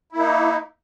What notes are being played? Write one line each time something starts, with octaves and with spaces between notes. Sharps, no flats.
A#3 D#4 E4